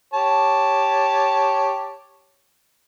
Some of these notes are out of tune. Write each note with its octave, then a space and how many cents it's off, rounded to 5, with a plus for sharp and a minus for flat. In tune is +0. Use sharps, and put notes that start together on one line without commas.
G4 +0 C#5 +0 A5 +0